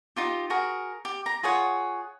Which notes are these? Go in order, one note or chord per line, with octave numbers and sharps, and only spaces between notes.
D#4 F4 G4
F#4 G#4 A#4 A#5
G4
A#5
F4 G#4 C#5 F#5